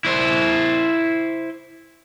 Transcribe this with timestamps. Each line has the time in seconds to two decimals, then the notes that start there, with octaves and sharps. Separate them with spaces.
0.05 E4 C5